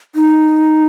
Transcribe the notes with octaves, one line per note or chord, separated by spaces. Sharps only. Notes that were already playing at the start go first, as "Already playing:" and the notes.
D#4